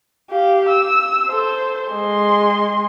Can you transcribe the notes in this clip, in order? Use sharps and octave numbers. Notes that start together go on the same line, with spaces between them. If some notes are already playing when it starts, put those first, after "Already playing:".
G4 F5
E6
A4 C5
G#3 C6